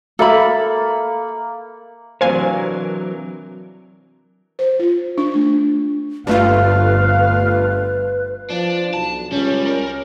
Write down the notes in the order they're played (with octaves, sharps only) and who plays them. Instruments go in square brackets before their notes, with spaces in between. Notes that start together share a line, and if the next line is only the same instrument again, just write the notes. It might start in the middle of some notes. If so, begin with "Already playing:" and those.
[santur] A#3 [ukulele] A4 E5 B5
[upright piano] C3 E3 D4 [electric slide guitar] F#3 A#4 [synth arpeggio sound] C5 F5 G#5
[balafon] C5
F4
D4
A3
[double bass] G1 [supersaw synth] G2 A3 F4 [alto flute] B4 [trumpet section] F5
[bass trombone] F3 [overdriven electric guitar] D4
[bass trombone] B1 [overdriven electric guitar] A5
[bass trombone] C#2 [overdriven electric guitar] G3 [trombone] C#4
[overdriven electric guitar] A#4